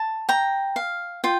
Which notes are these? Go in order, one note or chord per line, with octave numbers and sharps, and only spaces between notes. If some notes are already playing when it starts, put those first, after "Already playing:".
Already playing: A5
G5 A#5
F5
F4 G5